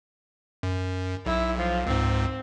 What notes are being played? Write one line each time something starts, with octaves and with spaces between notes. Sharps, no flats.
F#2
B1 E4
F3
C#2 G#2 C4